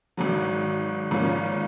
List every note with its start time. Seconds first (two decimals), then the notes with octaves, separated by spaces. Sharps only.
0.17 G#1 G#2 F#3
1.11 G#1 G#2 F3 A#3 C#4